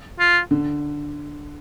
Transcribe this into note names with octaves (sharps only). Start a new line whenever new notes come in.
F4
D3